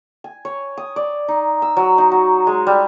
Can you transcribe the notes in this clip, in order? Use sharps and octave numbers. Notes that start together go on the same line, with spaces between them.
G#5
C#5
D#6
D5
D#4
E6
F#3
D#4
F#4
G#3
G3